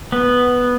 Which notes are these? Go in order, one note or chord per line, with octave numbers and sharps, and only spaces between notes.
B3